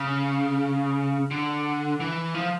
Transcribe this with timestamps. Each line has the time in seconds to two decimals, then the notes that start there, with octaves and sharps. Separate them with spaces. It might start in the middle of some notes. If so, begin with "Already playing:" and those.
Already playing: C#3
1.31 D3
2.00 E3
2.35 F3